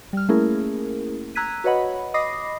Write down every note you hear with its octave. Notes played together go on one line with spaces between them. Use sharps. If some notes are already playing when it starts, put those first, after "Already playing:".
G3 F6
A3 A#3 C#4 E4 G#4 A#4
A#5 E6 F#6 G#6 B6 D#7
F#4 B4 C#5 D#5 F#5 B5
D#5 B5 D6 D#6 A#6 C7